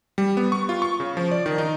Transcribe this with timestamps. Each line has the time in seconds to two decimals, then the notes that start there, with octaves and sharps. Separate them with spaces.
0.18 G3
0.37 B3
0.52 C#6
0.69 F4
0.82 C#6
1.00 C#3
1.17 F3
1.31 D5
1.46 D#3
1.58 D#4